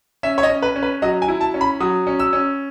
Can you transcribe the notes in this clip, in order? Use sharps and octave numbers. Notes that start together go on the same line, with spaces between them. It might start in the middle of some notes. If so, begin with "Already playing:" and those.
C#4 E5
C#5
D#5
C#4
B4
C#4
B4
F#3 D#5
G#5
E4
A5
C#4
B5
F#3 D#6
C#4
E6
C#4